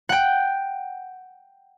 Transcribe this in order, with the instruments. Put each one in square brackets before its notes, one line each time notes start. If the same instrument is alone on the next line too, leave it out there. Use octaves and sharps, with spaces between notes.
[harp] F#5 G5